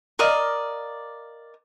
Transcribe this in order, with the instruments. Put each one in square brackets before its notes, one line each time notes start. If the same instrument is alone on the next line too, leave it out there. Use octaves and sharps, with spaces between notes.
[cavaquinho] A#4 D5 D#5 F5